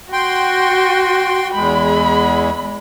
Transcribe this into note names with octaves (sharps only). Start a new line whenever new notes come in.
F#4 G5 C6
E2 G#3 B5